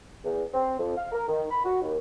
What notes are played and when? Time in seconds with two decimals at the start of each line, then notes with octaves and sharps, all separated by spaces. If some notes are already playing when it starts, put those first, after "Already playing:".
0.24 E2
0.54 C4
0.79 F2
0.96 F5
1.12 A#4
1.27 D#3
1.50 B5
1.65 F#4
1.82 D#2